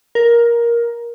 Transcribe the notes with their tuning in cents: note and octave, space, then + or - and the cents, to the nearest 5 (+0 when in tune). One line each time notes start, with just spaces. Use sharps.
A#4 +10